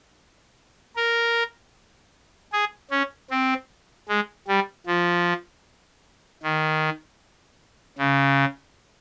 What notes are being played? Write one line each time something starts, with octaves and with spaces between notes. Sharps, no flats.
A#4
G#4
C#4
C4
G#3
G3
F3
D#3
C#3